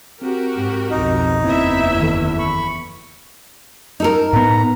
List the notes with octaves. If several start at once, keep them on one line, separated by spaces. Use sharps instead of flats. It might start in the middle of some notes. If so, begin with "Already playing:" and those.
C4 F#4 G4 A#4
G#2
B1 F2 D#4
F#1 E2 C4 E4 E5
D#3 E3 A4
B5 C#6
D#4 A4 A#4
A2 B3 A#5